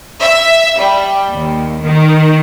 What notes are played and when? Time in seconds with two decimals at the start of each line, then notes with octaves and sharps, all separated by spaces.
0.20 E5
0.79 G3
1.32 D#2
1.83 D#3